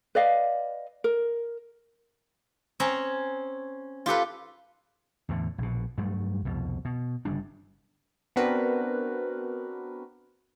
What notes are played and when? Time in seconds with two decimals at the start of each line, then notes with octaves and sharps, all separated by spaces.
0.15 B4 D5 D#5 F5
1.04 A#4
2.80 C4 C#4 A#5
4.06 F4 G4 A4 B4
5.29 E2 A2 D3
5.58 A#1 B2
5.98 G2 F#3 G3 A3
6.45 C2 F2 B2
6.85 B2
7.25 G1 C#3 G3 D4
8.36 B3 C4 D4 F#4 A#4 B4